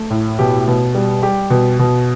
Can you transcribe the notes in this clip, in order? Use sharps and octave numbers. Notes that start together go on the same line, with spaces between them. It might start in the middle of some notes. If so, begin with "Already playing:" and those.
Already playing: A3
A2
B2 G4
B2
G3
G3 G4
B2
B2